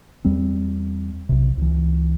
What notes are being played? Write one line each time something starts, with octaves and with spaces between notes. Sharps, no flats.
E2 G3 C4
B1 C3
C#2 E3